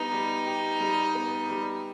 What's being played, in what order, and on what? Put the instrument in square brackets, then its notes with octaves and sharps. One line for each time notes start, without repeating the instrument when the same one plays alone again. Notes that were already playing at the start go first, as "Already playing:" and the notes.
Already playing: [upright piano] G3 B3 [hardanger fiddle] D#4
[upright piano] G3
G4
G3
B3
G3